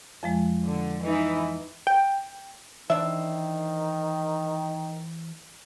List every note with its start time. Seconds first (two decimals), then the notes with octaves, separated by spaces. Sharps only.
0.23 F2 F3 G#3
0.65 D3
1.04 E3 D#4 E4
1.87 G5
2.90 D#3 E3 D4 C5 E5